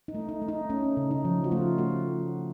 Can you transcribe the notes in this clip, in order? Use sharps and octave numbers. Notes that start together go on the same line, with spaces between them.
D#4
A3
D#4
A3
D#4
A3 C#4
C#3
D#4
F3
F#4
A3 F4
A3 F#4